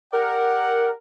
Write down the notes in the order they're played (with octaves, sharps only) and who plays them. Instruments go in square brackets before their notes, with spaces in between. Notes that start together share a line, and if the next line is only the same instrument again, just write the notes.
[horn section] G4 D5 F#5 [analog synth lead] A#4